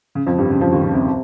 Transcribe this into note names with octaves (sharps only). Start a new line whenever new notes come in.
C#3
F2 F3
G2 G3
C#3
F2 F3
D#2 D#3
C#3
C3